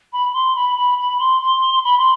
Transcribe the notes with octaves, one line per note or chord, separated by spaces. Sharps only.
B5
B5
C6
B5
B5
B5
C6
C6
B5
C6